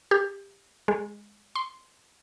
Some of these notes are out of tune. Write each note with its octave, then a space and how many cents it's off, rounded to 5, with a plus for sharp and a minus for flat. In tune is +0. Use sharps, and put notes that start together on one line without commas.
G4 +20
G#3 -10
C6 -5